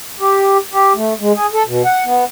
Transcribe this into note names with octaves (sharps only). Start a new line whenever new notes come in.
G4
G4
A3
G#3
G#4
A4
B2
F#5
B3